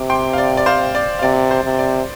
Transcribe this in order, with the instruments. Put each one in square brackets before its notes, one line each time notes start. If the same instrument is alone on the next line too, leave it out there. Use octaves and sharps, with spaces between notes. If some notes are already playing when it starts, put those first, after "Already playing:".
Already playing: [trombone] C3 [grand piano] D6
[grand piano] G5 C6
F5
D5
D5
C5 F5
D5
F5
[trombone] C3 [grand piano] D5
[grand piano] C5
[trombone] C3
[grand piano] D5